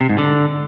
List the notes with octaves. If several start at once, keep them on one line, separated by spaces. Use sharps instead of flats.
C3
G#2
D3